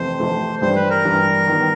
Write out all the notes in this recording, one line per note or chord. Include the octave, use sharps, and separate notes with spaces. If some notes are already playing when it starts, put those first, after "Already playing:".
Already playing: F2 C3 E3 A3 C4 C5
F2 C3 E3 A3 C4
G2 E3 G3 C5
B4
A#4
G2 E3 G3
D#3 G3 B3